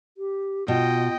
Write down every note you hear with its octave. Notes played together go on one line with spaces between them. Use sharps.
G4
B2 F4 D#5 G5